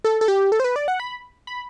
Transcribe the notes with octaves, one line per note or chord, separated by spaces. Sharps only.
A4
A4
G4
A4
C5
B4
D5
F#5
B5
B5